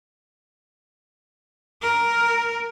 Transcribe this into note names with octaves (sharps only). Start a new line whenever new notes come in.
A#4